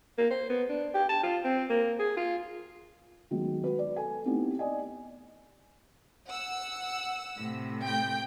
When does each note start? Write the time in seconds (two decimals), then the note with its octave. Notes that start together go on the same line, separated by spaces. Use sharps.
0.18 A#3
0.30 C5
0.49 B3
0.69 D4
0.94 G4
1.09 A5
1.23 F4
1.44 C4
1.69 A#3
1.99 G#4
2.16 F4
3.31 D#3 F#3 G#3 B3
3.64 F#4 B4
3.79 D5
3.96 A4 G#5
4.25 A3 B3 C4 D#4 E4 G4
4.59 D5 D#5 G#5
6.28 F#5 E6
7.38 A2 C3
7.83 G5 G6